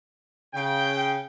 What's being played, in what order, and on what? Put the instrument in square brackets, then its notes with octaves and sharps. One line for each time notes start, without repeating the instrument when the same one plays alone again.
[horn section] C#3 [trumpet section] G5